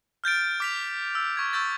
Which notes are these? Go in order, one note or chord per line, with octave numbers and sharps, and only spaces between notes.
F6 G6 A6 D7
D6 B6 F7
E6
C#6 G#6
C#6 E6 G6 A6